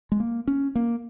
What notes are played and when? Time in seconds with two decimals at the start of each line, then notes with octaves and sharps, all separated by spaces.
0.12 G#3
0.20 A#3
0.48 C#4
0.75 A#3